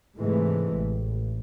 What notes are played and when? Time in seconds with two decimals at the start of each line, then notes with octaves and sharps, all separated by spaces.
0.17 G#2 C3 E3 G#3 A3
0.75 A1